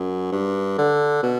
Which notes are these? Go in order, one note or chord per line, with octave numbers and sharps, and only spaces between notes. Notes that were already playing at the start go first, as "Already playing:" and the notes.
Already playing: F#2
G2
D3
B2